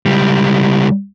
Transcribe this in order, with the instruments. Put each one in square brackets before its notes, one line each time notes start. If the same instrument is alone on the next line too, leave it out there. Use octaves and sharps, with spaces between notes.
[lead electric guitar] C#2 G3